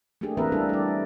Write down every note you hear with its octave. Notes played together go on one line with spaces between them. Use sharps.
A3 A#3 D4 G4 G#4
E3 A#3 C4 A#4 B4 E5
G3 A3 D4 E4 A4
G4 D5